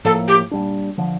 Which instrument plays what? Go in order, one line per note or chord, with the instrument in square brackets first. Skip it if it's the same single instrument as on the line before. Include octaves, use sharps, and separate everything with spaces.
[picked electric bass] A2 F3 A#3 [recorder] A4
[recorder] G4
[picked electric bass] A#2 G3 D4
D3 F3